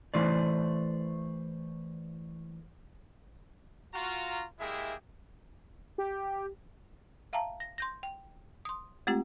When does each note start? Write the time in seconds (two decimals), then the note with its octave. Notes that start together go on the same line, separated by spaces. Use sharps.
0.14 E3 A3 C5 D5
3.94 F4 F#4 A#5
4.59 G#3 A#3 E4 G4 G#4 E5
5.98 G4
7.33 E5 F5 G5 A5 A#5
7.60 A#6
7.78 C6 G6 A#6
8.03 G5
8.65 C6 D#6
9.07 G#3 A3 C4 F4 G4